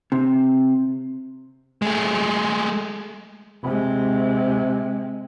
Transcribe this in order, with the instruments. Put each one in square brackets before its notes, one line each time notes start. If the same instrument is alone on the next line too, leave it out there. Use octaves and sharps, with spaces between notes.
[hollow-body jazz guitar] C3
[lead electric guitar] G#3 A3
[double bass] C3 G#3